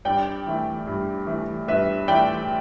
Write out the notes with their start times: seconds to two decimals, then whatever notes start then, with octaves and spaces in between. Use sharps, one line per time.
0.05 G2 D5 G5
0.47 E3 A3
0.87 G2
1.27 E3 A3
1.68 G2 B4 E5
2.08 E3 A3 D5 G5